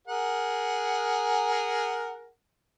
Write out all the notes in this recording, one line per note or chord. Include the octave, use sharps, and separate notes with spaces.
G#4 A#4 F#5